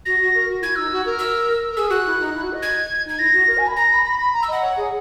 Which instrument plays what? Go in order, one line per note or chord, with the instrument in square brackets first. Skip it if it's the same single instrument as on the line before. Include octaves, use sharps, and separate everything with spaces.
[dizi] F#4 [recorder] A#6
[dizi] F#4
A#4
F#4
[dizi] E4 [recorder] G#6
[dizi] D#4 [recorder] E6
[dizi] F#4
A#4
[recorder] E6
[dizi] A#4
[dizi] G#4 [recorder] E6
[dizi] F#4 [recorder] F#6
[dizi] E4
D#4
E4
F#4
D#5
[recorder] G#6
[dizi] D#4 [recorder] G#6
[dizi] E4 [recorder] A#6
[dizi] F#4
A#4
G#5
B5
[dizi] A#5 [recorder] A#6
[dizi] B5
B5
B5
A#5
[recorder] E6
[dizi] D#5 [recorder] F#5
[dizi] C#5
G#4